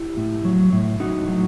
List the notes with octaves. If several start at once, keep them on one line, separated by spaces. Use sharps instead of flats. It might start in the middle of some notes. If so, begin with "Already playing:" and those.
Already playing: E4 G4
A2
F#3
A2
A2 D#4 F#4
F#3